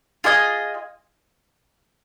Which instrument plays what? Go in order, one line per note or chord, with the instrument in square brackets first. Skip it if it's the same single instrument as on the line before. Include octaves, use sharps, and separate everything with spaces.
[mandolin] F4 G#4 D#5 G#5